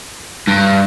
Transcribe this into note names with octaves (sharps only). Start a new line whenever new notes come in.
G2